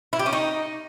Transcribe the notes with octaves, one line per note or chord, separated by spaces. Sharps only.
E4
G4
C#4
D#4